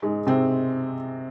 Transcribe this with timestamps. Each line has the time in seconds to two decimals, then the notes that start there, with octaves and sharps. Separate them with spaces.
0.02 G#2 G#3
0.27 C3 C4